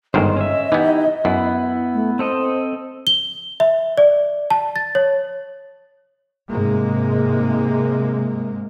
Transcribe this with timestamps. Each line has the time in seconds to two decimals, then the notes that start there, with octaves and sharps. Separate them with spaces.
0.14 G1 G#2 D#3 C5 D#5
0.36 C#4 E5
0.72 E3 B3 D#4 E4 G4
1.25 F#2 B3 E4
1.94 A3
2.19 C4 A4 C5 D#5
3.07 G7
3.60 E5
3.98 D5
4.50 A5
4.76 A6
4.95 C#5
6.49 G#2 C3 G#3 A#3